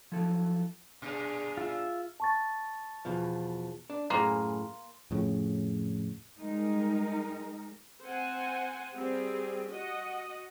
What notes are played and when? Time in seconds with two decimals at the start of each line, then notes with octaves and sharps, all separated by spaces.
0.12 F3 F#3 E4 A4
1.02 G2 A#2 D4 G#4
1.57 F4 E5
2.20 A5 C#6 A6
3.05 E2 B2 F3
3.90 D4
4.10 F#2 A2 A#3 G#4 C6
5.11 F2 A2 C#3
6.39 G3 G#3 D#4 A#4
8.02 C4 C5 F#5 G#5
8.95 G3 C4 G4 G#4
9.70 F#4 D#5 F#5